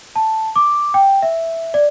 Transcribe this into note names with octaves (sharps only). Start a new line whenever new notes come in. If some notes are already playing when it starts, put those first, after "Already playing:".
A5
D6
G5
E5
D5